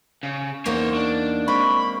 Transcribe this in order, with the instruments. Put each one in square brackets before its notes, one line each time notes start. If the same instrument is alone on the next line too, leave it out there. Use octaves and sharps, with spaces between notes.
[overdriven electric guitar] C#3
[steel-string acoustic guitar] E2 A#3 D#4 [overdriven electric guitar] C5 C#5
[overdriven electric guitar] D4
[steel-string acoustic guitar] G#3 A#3 C4 [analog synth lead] B5 [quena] C#6